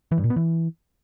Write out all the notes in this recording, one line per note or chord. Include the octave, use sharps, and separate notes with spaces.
E3
G2
A#2
B3
E3